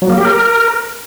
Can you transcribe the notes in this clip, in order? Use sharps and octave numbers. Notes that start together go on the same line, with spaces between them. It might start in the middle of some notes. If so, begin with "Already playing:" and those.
F#3
A#3
G4
A#4